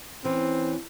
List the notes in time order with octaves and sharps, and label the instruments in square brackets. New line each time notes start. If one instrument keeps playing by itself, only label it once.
[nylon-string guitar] E3 C#4 [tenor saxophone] C4